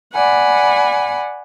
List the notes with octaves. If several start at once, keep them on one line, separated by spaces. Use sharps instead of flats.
D5 F#5 G#5 B5